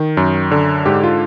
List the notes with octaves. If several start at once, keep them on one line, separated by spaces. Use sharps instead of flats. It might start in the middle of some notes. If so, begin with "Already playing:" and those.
Already playing: D#3
F#2
D3
G#2 G4
F4